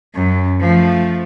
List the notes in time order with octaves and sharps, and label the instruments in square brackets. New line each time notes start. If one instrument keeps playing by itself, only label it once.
[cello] F#2
F3 A3